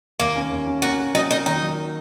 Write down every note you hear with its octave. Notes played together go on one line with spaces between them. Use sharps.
D#2 A#3
C#4
D#2
C#4
A#3 F#4
A#3
F#3 D#4
A#3 D#4
D#3 D#4
F#3